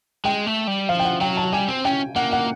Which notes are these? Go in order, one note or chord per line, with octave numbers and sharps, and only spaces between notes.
G#3 G5
A3
G3
F3 F5
G5
F#5
F#3 G5
A5
G3 G#5
C4
C#4 G5
A#3 F#5
F#5